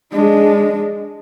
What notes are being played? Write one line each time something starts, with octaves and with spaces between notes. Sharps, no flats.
G#3 D4